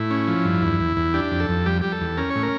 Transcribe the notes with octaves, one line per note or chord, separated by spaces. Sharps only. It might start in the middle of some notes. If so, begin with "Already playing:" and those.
Already playing: A2 E4
C#4
F3
G2
E2
E2
E2
D4 G4
F2
A4
F2
G3 G4
G3 G4
A4
E2
C#4 A#4
C#5
A2
A#4